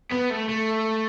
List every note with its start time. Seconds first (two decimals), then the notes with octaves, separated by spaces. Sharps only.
0.11 B3
0.30 A3
0.49 A3